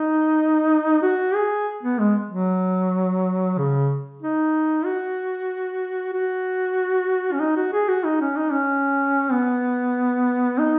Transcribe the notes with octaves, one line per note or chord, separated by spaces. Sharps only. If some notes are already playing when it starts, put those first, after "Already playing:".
Already playing: D#4
F#4
G#4
B3
G#3
F#3
C#3
D#4
F#4
F#4
C#4
D#4
F#4
G#4
F#4
D#4
C#4
D#4
C#4
B3
D#4